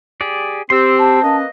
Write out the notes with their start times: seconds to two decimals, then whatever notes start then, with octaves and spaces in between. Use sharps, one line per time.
0.21 G4 G#4 D5
0.70 C4 G4 C6 E6
0.99 A5
1.23 A#3 C#4 B4 D#5